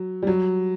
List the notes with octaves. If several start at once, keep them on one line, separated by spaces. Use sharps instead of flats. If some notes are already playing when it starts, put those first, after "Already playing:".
Already playing: F#3
G3
F#3